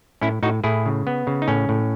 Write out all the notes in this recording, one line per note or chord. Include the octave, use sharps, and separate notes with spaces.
A2 C#4 E4
A2 D#4 F#4
A2 E4 G#4
C#3
B3
C#3
D#4
A2 C#4
A2